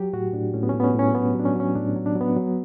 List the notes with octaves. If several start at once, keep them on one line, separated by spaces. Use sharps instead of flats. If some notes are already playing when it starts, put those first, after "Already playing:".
Already playing: F#3 G4
A2 F#4
A2 D4
A2 C#4
B3
C#4
A2
B3
C#4
A2 C#4
F#3 B3
F#3 D4
C#4
F#3
C#4
A2 D4
F#3
D4
F#3
B3
F#3